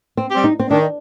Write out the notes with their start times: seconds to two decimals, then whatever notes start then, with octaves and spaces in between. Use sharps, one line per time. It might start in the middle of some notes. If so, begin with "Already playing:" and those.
0.17 C4
0.30 G3 C4 G4
0.44 D#4
0.59 C4
0.71 D#3 D4